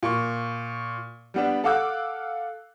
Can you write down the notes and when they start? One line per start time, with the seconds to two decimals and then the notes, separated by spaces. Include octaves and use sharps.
0.03 A#2 C#6
1.34 G3 B3 D4
1.64 A4 F5 F#5 D6 E6 F#6